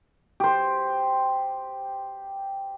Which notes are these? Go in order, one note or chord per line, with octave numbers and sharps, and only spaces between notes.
G4 C5